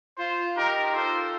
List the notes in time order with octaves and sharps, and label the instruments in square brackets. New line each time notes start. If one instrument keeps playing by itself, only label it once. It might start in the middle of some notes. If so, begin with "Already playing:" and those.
[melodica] F4 [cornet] C5
[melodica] D#4 G4 [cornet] A#4
[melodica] F4 A4 [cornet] C5